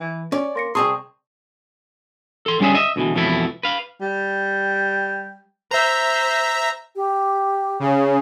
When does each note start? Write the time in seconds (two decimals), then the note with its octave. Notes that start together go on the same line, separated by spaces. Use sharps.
0.01 E3
0.32 C#4 D5
0.56 A#3 C6 A#6 C#7
0.75 C2 C4 G#4 A5 C6 C#6 D#6
2.46 A4 C6
2.60 D3 G3 C#4 G#4 E5
2.75 D#5 E5
2.96 D2 B2 E3
3.15 F2 B2 E3 A3 E4
3.63 B4 F5
4.01 G3 G5
5.71 C5 E5 A#5
6.96 G4
7.80 C#3